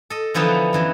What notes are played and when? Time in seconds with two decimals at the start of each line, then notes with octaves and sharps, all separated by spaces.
0.10 A4 D#5
0.34 D3 E3 F3 B3 D#4
0.73 F#2 E3 F#3